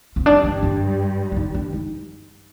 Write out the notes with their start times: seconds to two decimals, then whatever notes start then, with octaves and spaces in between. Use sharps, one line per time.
0.16 C4
0.26 G2 G3 D4
0.44 D#4
0.63 D4
1.32 D4
1.36 D#4
1.54 D4
1.73 D#4